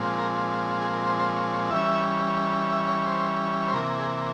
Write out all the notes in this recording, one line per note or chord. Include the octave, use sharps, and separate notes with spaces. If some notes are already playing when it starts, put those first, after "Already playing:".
Already playing: A#2 F3 G#3 C4
A#4
G#4
A#4
C5
C5
C#5
C#5
E3 G3 C#4 E5
E5
C#5
C5
C5
C3 E3 A#3 A#4
G#4